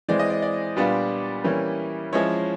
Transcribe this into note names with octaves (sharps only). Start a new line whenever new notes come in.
E3 G#3 C4 D5
D#5
D5
D5
A#2 G3 B3 D4 F4
E3 G3 A#3 C#4 E4
F3 G#3 C#4 E4 C#5